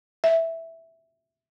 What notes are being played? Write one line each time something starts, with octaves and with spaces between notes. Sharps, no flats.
E5